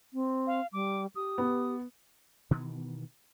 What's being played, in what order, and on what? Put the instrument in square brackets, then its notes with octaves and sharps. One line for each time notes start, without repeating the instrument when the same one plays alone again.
[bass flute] C4
[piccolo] F5
[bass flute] G3 [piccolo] D6
[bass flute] G4 [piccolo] D#6
[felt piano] B3
[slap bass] B2 D#3 E3 B3